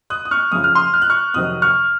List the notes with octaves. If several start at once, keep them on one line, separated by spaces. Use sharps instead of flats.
D#6 F#6
D#6
C#6 F6
F#2 C#3 F3 D#6
F6
C6 D#6
F6
F#6
C#6 F6
F2 C3 D#3 F#3 C4 D#6 F#6
C#6 F6